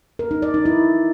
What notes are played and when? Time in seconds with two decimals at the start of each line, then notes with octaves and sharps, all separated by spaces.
0.19 A#4
0.31 D#4
0.42 D5
0.54 D#4
0.66 E4